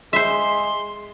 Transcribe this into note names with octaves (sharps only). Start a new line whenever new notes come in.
G#3 C5 E5 C6